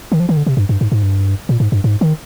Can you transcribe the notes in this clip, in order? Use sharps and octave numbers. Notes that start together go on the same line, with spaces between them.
D#3
F3
D#3
D3
C3
G2
G2
G#2
G#2
G2
A#2
G#2
G2
G#2
D#3